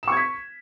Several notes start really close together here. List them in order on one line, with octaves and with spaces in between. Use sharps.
E7 C#6 G#6 B6